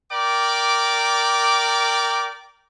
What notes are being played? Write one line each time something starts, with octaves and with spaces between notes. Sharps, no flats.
A#4 D5 G5 D6